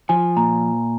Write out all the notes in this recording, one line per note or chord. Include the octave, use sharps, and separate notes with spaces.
F3 G#5
A#2 A#5